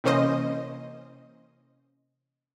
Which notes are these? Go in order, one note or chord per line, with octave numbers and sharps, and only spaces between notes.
C3 E3 A#3 C#4 C5 D#5